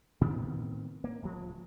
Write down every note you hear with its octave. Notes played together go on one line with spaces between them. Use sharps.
A2 D#3 B3 C4
A#3
D1 C#2 F3